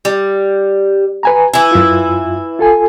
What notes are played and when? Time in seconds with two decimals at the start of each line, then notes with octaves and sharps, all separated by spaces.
0.05 G3
1.23 B4 G#5 A#5
1.53 E3 E4 G#5
1.72 F#2 F4
2.59 F4 A4 G#5